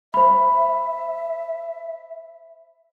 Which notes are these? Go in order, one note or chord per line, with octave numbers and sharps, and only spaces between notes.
C5 E5 B5